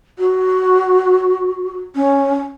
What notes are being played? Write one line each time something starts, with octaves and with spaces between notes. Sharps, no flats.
F#4
C#4